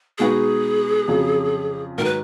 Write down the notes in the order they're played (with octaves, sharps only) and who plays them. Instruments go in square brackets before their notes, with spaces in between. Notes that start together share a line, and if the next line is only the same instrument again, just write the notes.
[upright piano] B2 G#3 D#4 F#4 B4 [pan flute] G#4
[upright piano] F2 C#3 F#3
[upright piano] G#2 D#3 F#3 [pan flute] A#4
[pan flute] B4